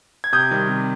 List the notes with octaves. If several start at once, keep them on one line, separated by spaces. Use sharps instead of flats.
G#6
C3 D#6 G6
D#3 G3 C4
C3